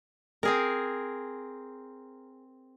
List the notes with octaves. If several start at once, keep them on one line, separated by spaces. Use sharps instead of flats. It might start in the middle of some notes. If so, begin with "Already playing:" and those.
C4 G#4 A#4